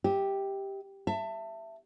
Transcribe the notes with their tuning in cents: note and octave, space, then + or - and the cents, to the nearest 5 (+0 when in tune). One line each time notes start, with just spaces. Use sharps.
G4 +0 E5 -45
E5 +15 A5 +25